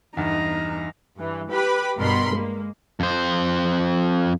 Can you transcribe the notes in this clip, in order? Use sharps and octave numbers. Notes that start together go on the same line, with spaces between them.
E2 G2 D#4 A#5
G2 E3
G4 B4 B5
G1 G2 B2 A#4 B5 C6
G#3 A#3
F2 C5